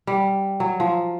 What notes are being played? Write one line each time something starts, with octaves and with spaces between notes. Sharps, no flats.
G3
F#3
F3